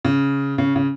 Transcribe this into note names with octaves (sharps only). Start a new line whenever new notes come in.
C#3
C#3
C#3